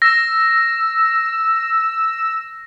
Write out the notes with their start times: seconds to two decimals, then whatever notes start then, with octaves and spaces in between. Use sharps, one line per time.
0.02 E6 A#6